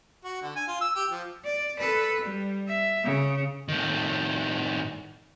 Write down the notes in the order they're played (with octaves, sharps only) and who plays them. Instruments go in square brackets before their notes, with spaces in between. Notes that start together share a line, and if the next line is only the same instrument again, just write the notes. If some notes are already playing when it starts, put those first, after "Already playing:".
[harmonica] F#4
D3
G#5
F4
E6
G4
F3
[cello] D5
A4 B4
G3
E5
C#3
[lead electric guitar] A2 D#3